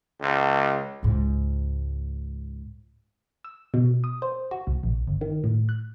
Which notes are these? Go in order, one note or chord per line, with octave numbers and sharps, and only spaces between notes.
C#2
C#2 G#2
E6
B2
D#6
C5
F#4
C2
A#1
G1
D#3
A2
F#6